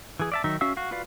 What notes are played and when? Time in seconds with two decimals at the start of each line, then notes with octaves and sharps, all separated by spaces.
0.20 E3 G#4
0.32 D5 E5 A5
0.44 D#3 F#3 D#4 E5
0.61 C#4 F#4 E5 F5 E6
0.77 F#4 F5
0.91 F4 F#4 B4 D5 F5